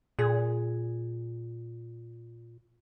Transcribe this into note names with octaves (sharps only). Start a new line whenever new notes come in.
A#2 G#4